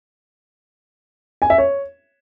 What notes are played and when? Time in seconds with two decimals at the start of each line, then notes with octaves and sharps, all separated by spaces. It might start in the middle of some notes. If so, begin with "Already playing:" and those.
1.42 G#5
1.50 E5
1.58 C#5